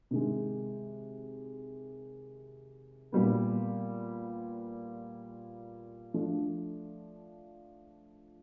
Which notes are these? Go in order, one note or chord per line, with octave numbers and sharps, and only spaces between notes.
C3 D#3 G#3
A#2 G3 B3
F3 A3 D4